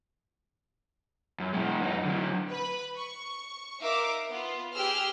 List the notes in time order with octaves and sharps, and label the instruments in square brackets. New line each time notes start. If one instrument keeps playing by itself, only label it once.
[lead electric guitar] F#2
B2 G#3
F#2 D#4
D3 F#3
[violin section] B4 B5
C#6
D#4 A#4 E5 F5 D6
B3 F4
G4 G#4 E6 F6